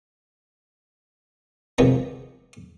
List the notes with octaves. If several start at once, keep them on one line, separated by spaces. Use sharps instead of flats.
C3 D#3 F3 G#3 B3